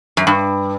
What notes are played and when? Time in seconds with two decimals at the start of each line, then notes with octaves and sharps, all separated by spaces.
0.17 F#2
0.27 G2